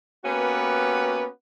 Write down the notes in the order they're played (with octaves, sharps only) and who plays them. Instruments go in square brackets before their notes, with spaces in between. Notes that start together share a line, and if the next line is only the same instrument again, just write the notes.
[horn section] A#3 B3 C#4 F#4 G4 B4